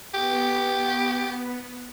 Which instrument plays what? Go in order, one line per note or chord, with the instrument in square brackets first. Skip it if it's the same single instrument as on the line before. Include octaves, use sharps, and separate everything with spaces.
[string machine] B3 [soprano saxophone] G4